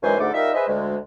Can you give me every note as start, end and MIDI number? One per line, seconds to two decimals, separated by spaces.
0.03 0.16 42
0.03 0.16 51
0.03 0.16 52
0.03 0.16 56
0.03 0.16 72
0.03 0.16 80
0.19 0.29 38
0.19 0.29 44
0.19 0.29 50
0.19 0.29 57
0.19 0.29 69
0.19 0.29 86
0.33 0.50 55
0.33 0.50 63
0.33 0.50 65
0.33 0.50 70
0.33 0.50 76
0.54 0.68 68
0.54 0.68 71
0.54 0.68 72
0.54 0.68 75
0.54 0.68 76
0.68 0.95 38
0.68 0.95 56